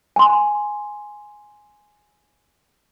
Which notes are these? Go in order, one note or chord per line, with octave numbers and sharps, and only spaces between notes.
G#5 C6